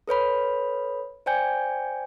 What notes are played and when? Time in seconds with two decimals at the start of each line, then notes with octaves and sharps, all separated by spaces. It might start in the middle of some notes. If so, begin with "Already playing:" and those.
0.08 A4 B4 C#5 B5
1.26 C5 D5 G5 G#5 G6